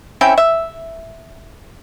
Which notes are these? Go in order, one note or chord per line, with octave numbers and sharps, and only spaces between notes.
C4 C#4 E4 G5
E5